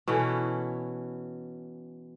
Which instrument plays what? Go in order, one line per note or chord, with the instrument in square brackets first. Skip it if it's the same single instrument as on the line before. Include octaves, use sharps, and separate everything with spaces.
[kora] B2 E3 C#4 A4